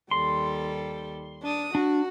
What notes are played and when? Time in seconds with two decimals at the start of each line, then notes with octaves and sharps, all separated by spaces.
0.11 D#2 G3 A4 C6
1.43 D4 D#6
1.75 D4 F#4